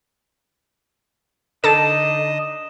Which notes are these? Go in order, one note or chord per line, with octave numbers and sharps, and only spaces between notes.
D3 D4 D#4 A4 D#5 A5 D#6 E7